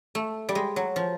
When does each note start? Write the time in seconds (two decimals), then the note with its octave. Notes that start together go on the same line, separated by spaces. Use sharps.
0.15 A3
0.49 G3
0.55 G#3
0.76 F#3
0.96 F3